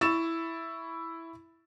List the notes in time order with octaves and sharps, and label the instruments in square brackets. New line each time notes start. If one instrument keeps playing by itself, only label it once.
[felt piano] E4 C#6 A6 E7